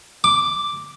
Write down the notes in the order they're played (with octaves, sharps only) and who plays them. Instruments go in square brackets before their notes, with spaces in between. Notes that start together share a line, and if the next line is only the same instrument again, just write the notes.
[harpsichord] D6